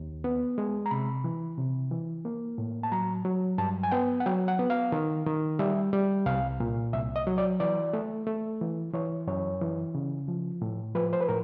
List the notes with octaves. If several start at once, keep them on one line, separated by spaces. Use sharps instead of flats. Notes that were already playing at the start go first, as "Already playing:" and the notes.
Already playing: D#2
B3
G#3
A#5
C3 B5
E3
C3
E3
A#3
A2
A5
F#3 A#5
F#3
G2 A5
G#5
B3 G5
F#5
F#3 G5
F#5
B3
F5
D#3
D#3
G3 E5
G3
C2 F5
A#2
C2 E5
D#5
F#3
D5
E3 D5
A3
A3
E3
E3 C#5
F#2 C#5
E3
C#3
F3
A2
F3 B4
C5
B4
A2 A#4